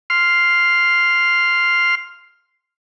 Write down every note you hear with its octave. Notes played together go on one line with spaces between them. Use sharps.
C6 F6